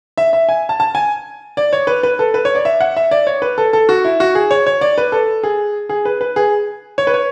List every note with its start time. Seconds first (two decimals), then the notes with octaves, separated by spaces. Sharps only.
0.18 E5
0.33 E5
0.49 G#5
0.69 A5
0.80 A5
0.95 G#5
1.57 D5
1.73 C#5
1.87 B4
2.03 B4
2.19 A4
2.34 B4
2.45 C#5
2.55 D5
2.65 E5
2.81 F#5
2.97 E5
3.11 D5
3.27 C#5
3.42 B4
3.58 A4
3.73 A4
3.89 F#4
4.05 E4
4.20 F#4
4.35 G#4
4.51 C#5
4.66 C#5
4.81 D5
4.98 B4
5.12 A4
5.43 G#4
5.89 G#4
6.05 B4
6.21 B4
6.36 G#4
6.98 C#5
7.07 B4
7.14 C#5